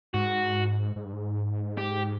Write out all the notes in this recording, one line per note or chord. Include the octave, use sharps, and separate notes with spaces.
G#2 F#4
G#2
G2
G#2
G4